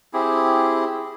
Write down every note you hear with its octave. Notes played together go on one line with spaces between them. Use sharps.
C4 E4 G4 G#4